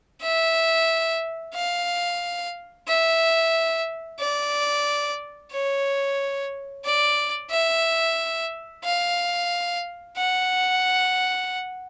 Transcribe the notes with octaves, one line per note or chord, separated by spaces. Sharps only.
E5
F5
E5
D5
C#5
D5
E5
F5
F#5